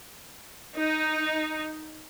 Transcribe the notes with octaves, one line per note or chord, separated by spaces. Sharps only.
D#4